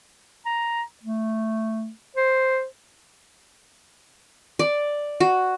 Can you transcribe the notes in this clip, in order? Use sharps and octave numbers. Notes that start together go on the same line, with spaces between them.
A#5
A3
C5
D5
F#4